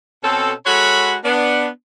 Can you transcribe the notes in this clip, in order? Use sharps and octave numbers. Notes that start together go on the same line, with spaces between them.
B2 C4 C#4 A4
G#3 F#4 A4 C#5 F#5 B5
B3 D4